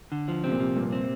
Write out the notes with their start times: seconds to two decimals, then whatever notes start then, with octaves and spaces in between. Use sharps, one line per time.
0.12 D3
0.28 F3
0.44 C3 C4
0.52 A#2
0.60 C3 F3
0.76 G2 A#2
0.93 C4